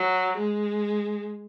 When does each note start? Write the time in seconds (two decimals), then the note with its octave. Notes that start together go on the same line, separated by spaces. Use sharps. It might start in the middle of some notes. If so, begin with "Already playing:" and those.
Already playing: F#3
0.38 G#3